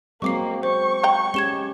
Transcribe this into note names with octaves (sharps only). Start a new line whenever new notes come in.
F#3 G#3 A#3 C4 C#6 D6 C7
C5 C#6
G5 A#5
G#3 C#4 G4 G#6 E7 G7